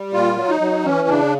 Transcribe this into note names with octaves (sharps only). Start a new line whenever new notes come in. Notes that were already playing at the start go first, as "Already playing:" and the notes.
Already playing: G3
A#2 F4
F#3
D#4
F#3
E3 C#4
C#3 D4